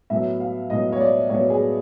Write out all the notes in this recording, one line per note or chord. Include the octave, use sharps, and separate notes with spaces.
A2 F#3 B3 E5
F5
A2 F#3 B3 D#5
C#5
D5
A2 F#3 B3 C#5
G#4